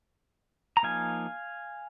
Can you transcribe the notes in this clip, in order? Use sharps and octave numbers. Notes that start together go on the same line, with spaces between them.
A#5
F3 A#3 D#4 F5 G#5